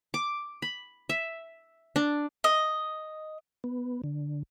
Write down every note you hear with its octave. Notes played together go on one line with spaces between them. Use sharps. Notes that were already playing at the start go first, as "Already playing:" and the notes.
D6
B5
E5
D4
D#5
B3
D3